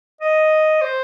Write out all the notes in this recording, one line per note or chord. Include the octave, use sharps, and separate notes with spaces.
D#5
C5